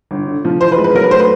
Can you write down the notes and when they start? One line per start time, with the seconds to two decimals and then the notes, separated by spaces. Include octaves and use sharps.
0.11 G1
0.28 D3
0.45 F3
0.61 E3 C5
0.72 B4
0.78 G#3
0.84 B4
0.95 F#3 A#4
1.04 B4
1.11 A3 C5
1.20 B4